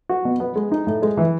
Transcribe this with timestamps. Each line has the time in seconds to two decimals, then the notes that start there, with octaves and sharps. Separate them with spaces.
0.09 F#4
0.25 B2
0.40 B3
0.56 G#3
0.72 D#4
0.87 A2
1.02 G#3
1.17 E3